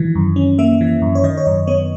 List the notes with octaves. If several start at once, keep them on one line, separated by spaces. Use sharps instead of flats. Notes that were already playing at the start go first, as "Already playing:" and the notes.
Already playing: D#3 E3
F#2
C#4
A#3 E5
E3
F#2
C#5
D#3 D#5
C#5
F#2 D#5
B3 C#5